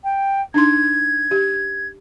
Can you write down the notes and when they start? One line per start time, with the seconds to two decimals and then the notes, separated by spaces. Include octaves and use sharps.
0.04 G5
0.54 D4 D#4 C6 G#6
1.31 G4